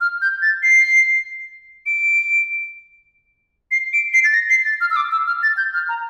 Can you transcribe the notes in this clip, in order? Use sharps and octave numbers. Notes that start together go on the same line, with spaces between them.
F6
G6
A6
C7
D7
C7
D7
C7
A6
A#6
C7
A6
F6
E6
D6
E6
F6
A6
G6
F6
A#5